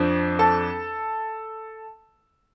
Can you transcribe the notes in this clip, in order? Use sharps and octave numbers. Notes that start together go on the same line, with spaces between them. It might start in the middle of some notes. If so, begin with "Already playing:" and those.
Already playing: F2 F3 D4
A4 A5